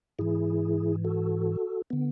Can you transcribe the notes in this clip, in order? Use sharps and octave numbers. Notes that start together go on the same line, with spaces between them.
G#2 E3 E4 G#4
F#4 A4
D3 B3